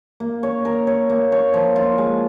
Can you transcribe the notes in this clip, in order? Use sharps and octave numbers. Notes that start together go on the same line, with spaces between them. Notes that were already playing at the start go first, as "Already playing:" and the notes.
A#3
C#5
A#4
C#5
A#3
C#5
F3
F4
G#3